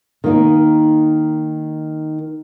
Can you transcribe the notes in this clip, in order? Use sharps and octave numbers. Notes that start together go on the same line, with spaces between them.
D#3 A#3 D#4